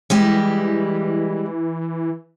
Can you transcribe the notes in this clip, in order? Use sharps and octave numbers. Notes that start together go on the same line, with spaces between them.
E3 G3 G#3 G4